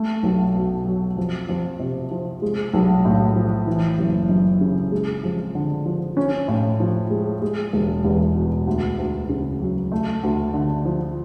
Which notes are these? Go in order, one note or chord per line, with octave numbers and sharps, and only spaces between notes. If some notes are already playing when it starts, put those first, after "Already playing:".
Already playing: A3
B1
B2
F#3
F2
F2
C3
F3
G#3
B1
A2
F3
E3
F#1
F#2
C#3
G#3
F2
D3
F3
C#4
A2
F3
G#3
G#3
E1
E2
B2
D2
D2
C#3
F#3
A3
D2
D3
F3